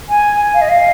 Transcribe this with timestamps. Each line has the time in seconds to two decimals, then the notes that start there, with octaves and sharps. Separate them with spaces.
0.09 G#5
0.54 F5
0.61 D#5
0.69 F5